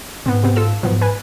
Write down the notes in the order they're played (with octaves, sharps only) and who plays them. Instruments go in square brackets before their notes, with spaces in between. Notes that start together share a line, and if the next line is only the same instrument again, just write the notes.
[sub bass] G#2 [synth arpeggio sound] B3 C4
[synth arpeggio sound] C3 B3 C4
F4 A4 E6
[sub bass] G#2 [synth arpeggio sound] F3 F#3 B3
[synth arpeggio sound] B4 G#5